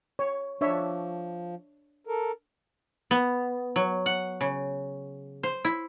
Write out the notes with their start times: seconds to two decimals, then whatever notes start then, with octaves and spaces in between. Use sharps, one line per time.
0.19 C#5
0.61 F3 D4 C#5 E5
2.07 A4 A#4
3.11 B3
3.76 F#3
4.06 F#5
4.41 C#3
5.43 C5
5.65 E4